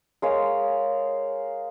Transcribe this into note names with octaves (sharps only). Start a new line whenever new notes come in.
G#3 A#4 C#5 F5